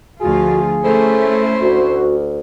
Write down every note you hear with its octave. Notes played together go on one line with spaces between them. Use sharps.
D2 F3 F4 F#4 G#4
A3 C#4 E4 A4 C5
D2 F#4